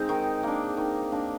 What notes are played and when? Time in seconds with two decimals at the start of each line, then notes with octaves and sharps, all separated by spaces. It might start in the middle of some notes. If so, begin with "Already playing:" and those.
Already playing: G#3 C4 D#4
0.09 D#3
0.43 A#3 D4
0.77 D#3
1.12 A#3 D4